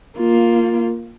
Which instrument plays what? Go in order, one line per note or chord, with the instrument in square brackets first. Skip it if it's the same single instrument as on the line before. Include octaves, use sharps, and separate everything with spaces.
[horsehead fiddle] A#3 F4